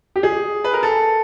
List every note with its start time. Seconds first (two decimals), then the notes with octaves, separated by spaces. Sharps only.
0.16 G4
0.23 G#4
0.64 B4
0.73 A#4
0.83 A4